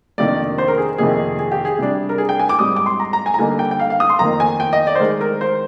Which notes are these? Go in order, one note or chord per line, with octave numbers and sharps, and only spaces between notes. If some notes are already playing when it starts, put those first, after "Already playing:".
F2 C3 D#3 A#3 D4 D5
C5
A#4
G#4
F2 C3 D#3 A#3 G#4
G#4
G4
G#4
C3 G3 D4
A#4
G#4
G5
G#5
D6
G#2 G3 C4 D#6
D6
C6
A#5
A#5
G#5
A#5
D3 G3 A#3 D#4 G#5
G5
G5
F5
F5
D#6
C6
F2 D#3 A#3 A#5
G#5
G5
D#5
D5
C5
D#3 G#3 D#4 A#4
A#4
C5